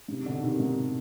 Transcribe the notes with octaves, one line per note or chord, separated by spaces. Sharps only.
G#2 C3
B2 D3
C3 D#3
G#2 C3